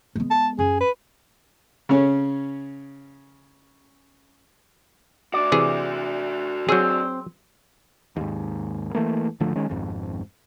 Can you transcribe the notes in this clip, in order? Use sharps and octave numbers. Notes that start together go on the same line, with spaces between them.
G#3 B3
A5
F#2 G#4
B4
C#3 C#4
D4 F#4 D5
C3 E3 G#4
F#3 C4 G#4
D#2 G#2
E3 A3 A#3
G#1 D3 F3 A3
D#3 G#3 C#4
G#1 F2 G#2